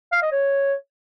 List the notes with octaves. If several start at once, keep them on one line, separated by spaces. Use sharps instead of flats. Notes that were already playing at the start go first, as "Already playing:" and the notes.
F5
D#5
C#5